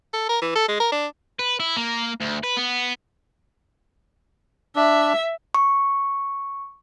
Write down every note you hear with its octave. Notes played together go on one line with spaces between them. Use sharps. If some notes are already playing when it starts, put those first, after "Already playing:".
A4
A#4
E3
A4
G#3
A#4
D4
B4
E4
A#3
D2
B4
B3
D4 E5
C#6